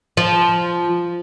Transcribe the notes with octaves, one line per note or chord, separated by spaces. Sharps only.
F3